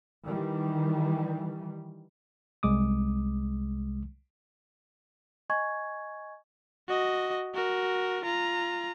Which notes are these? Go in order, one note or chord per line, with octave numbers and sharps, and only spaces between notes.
D#3 E3 G3
C2 G#3 D6 D#6
D#5 G#5 C#6 G#6
F#4 D#5
F#4 A#4
F4 A#5